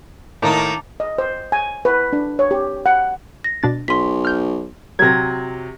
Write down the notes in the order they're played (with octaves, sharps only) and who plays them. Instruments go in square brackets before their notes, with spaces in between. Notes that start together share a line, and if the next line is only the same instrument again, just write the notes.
[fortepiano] A2 [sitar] D#3 A#3 D#4 [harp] A5 A#5 D6
[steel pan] D#5
C5
G#5
B4
D4
C#5
G4
F#5
[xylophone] A#6
[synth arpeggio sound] B2 D4 A6
[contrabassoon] B1 [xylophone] C6 B6
[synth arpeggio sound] F6 G6
[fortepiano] C3 F#3 [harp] G#6 A#6